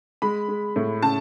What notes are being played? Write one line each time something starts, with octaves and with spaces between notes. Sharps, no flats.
G#3 B5
G#3
A2
C#3 A5